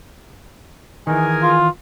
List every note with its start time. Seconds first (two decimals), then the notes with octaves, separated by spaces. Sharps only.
1.07 D#3 E3 G#4 A#4 G#5
1.43 F4